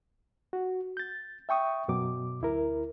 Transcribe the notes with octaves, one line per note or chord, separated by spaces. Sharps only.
F#4
G6 A6
E5 G5 C#6 D#6
F#2 B2 F#3 D6
D2 E4 A#4